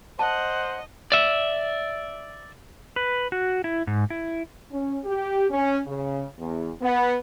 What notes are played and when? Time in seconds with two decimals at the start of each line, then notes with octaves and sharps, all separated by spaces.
0.19 C5 D#5 F#5 A5
1.12 D5 E5
2.96 B4
3.32 F#4
3.64 E4
3.87 G#2
4.10 E4
4.71 C#4
5.04 G4
5.50 C#4
5.87 C#3
6.38 E2
6.82 B3